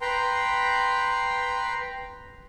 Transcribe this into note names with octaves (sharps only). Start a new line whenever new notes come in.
B4 G5 A#5 C6